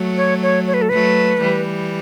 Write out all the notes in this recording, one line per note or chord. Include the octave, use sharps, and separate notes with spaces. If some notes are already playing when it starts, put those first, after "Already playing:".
Already playing: F#3 A3
C#5
C#5
C#5
B4
A4
F#3 A3 B4
E3 G3